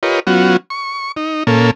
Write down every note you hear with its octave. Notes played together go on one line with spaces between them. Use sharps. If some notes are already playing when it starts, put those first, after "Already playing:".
F4 G4 A#4 B4 C#5 D#5
F#3 B3 C#4 F4 F#4
C#6
D#4
A#2 A#3 C#4 A4